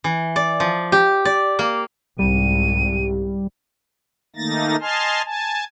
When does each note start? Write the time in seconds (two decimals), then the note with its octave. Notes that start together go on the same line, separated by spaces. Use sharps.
0.04 E3
0.36 D5
0.60 F3
0.92 G4
1.25 D5
1.59 A#3
2.19 C2 G#2 C3 G3 D#7
4.36 D#3 A3 A#3 D#4 A6 A#6
4.80 D#5 G#5 A5 C6 F6
5.25 G#5 A5